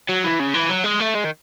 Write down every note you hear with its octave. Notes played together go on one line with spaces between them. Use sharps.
F#3
E3
C#3
E3
F#3
G#3
A3
G#3
D#3